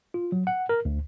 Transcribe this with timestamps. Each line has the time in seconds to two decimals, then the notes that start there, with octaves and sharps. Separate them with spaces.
0.14 F4
0.32 F#3
0.47 F#5
0.69 A#4
0.85 D2